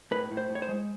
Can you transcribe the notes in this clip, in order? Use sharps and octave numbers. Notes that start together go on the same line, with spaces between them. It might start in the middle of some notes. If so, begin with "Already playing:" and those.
A2 B4
A2
C5
A2
C#5
C5
G#3